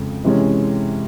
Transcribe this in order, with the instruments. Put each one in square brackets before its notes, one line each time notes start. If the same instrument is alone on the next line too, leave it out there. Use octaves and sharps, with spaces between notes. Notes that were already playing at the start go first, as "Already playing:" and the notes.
Already playing: [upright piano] F2 C#3 G#3
C3 E3 G#3 C#4